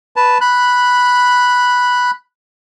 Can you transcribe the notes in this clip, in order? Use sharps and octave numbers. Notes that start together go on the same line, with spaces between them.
B4 A5
B5 F#6